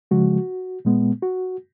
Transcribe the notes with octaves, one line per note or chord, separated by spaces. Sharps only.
C#3 F3 G#3 F#4
A#2 G#3 B3
F#4